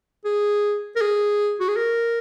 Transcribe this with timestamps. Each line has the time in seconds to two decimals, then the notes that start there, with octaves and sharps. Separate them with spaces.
0.25 G#4
0.96 A#4
1.01 G#4
1.60 F#4
1.69 G#4
1.77 A#4